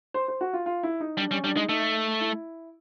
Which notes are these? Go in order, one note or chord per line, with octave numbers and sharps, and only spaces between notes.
C5
C5
F#4
F4
F4
E4
D#4
G3 D4
G3 C#4
G3 D4
G#3 D#4
A3 D#4
E4